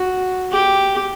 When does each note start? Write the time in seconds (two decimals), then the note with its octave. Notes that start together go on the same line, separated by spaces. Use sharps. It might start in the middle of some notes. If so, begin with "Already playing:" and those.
Already playing: F#4
0.52 G4